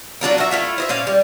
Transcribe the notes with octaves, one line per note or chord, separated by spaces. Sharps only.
F#3 D4 F4 A#4
F#4 E5
A3 E4 F4 E5
C5 D#5 E5
A#2 C#4 F5
G3